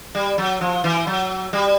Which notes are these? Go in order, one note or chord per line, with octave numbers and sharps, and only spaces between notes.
G3
F#3
F3
E3
F#3
G3